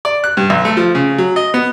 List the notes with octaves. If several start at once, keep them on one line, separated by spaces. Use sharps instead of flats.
D5
F#6
G2
B1
A3
F3
C#3
F#3
D#5
B3